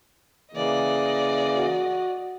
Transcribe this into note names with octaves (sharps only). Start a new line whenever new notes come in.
C#3 E3 A#3 D5 D#5
F#4